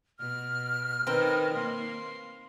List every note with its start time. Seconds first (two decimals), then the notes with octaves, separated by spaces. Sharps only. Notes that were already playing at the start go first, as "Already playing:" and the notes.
0.19 B2 F6
1.07 D#3 C4 A#4 B4 G5
1.56 A#3 C6